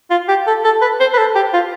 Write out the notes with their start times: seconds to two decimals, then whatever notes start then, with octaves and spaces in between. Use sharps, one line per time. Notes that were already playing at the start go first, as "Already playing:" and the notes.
0.10 F4
0.28 G4
0.47 A4
0.64 A4
0.81 B4
1.00 C5
1.13 B4
1.18 A4
1.35 G4
1.53 F4